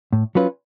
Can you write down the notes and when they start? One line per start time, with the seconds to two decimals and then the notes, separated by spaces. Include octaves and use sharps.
0.13 A2
0.35 F#3 C#4 F4 B4